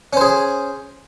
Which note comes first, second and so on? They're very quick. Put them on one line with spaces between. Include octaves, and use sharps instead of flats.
C#4 C5 G#4